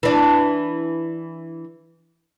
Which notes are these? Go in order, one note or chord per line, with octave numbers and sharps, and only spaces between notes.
E3 D4